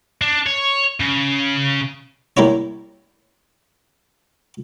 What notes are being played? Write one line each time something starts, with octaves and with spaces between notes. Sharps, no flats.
D4
C#5
C#3
G3 A#3 E4 C#5